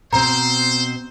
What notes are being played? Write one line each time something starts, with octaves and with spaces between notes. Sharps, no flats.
B2 C4 C5 A#5